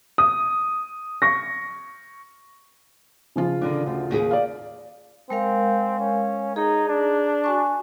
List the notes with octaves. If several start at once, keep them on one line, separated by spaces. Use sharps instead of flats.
D#6
C#6 A#6
C#3 F3 F4
D3 D#3 D4
D2
D#2 G4 G#4
D5 F5
G#3 C4 A#4 F5
C#4
D#4 G#4
D4
F#4 G#5 C#6